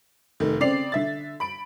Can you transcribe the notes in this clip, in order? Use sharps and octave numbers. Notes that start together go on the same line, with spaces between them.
F1 D#3 A3
C#3 C4 D5 C7 F7
D3 E5 A6
B5 D7